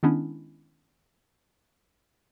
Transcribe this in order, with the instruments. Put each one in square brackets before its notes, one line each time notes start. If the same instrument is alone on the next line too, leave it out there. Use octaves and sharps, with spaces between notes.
[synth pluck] D#3 G#3 B3 C#4 D4 E4